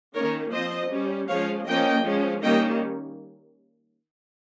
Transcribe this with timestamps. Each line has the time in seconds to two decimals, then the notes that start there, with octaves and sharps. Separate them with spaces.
0.15 D#3 A#3 C#4 A#4 C#5
0.52 F3 C4 C5 D#5
0.91 G3 C#4
1.29 F3 G#3 C#4 C#5 F5
1.67 F3 A#3 C#4 D#5 G5
2.04 F3 G#3 C#4
2.42 D#3 G3 A#3 C#4 D#5 G5